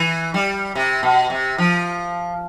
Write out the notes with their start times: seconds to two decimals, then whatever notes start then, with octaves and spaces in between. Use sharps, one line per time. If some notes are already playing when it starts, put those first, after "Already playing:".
Already playing: E3
0.34 G3
0.75 C3
1.03 B2
1.30 C3
1.58 F3